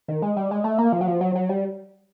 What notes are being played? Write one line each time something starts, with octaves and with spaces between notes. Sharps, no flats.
D#3
G#3
G3
G#3
A3
A#3
F3
F#3
F3
F#3
F#3
G3